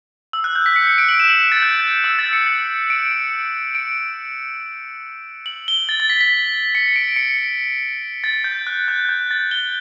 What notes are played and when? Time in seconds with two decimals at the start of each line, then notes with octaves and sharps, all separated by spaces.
0.33 E6
0.44 F#6
0.55 G6
0.66 B6
0.76 C#7
0.87 C#7
0.98 D7
1.09 F#7
1.20 E7
1.30 F#7
1.52 A6
1.62 G6
2.04 E6
2.19 A6
2.33 C#7
2.90 D7
3.11 C#7
3.75 D7
5.46 F#7
5.68 G7
5.89 A6
6.00 A6
6.10 B6
6.21 B6
6.75 C#7
6.96 D7
7.16 C#7
8.24 A6
8.44 G6
8.67 F#6
8.88 G6
9.09 G6
9.31 A6
9.51 G7